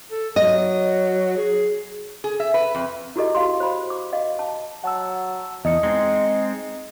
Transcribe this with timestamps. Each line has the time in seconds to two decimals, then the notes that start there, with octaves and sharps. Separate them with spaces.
0.11 A4
0.36 F#3 D#5
1.37 G#4
2.24 G#4
2.40 E5
2.54 B4
2.74 F2
3.16 E4 F#4 G4 A4 D#5
3.35 F#4 F5 C6
3.60 C5 B5
3.90 D6
4.13 D#5 F5
4.39 A5
4.84 F#3 F#5 A5 E6
5.65 E2 D#4 D#5 D#6 C#7
5.83 G#3 C4 D#4